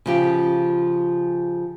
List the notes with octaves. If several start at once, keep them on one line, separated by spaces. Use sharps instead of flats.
C#3 F3 G4